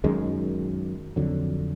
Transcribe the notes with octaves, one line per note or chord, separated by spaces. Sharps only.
F#2 D#3 G#3
F2 D3 F#3